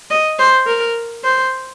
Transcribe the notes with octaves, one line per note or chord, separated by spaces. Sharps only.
D#5
C5
A#4
C5